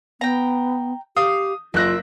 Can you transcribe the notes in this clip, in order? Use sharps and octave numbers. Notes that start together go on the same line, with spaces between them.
B3 G5 A#5
G4 F5 D#6
F#1 A#3 F4 E5 F#6 A#6